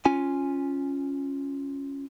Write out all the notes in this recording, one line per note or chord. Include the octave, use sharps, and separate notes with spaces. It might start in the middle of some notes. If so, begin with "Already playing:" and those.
C#4 F4 G#5